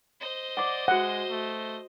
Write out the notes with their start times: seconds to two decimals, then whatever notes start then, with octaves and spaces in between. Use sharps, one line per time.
0.21 C5 D#5
0.57 D5 F#5 D6
0.88 G#3 F#4 E5 F#5
1.30 A3